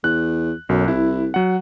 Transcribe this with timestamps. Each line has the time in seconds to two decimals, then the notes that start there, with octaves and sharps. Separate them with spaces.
0.04 E2 F#6
0.69 B1 F#2
0.88 C2 E4
1.34 F#3 F#5